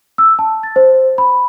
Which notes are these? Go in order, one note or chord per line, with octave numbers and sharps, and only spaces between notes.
E6
A5
A6
C5
B5